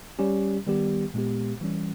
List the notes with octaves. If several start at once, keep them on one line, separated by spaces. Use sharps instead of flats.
G3 C#4 G4
D#3 G3 B3 G4
A#2 G#3 B3 G4
E3 G3 C#4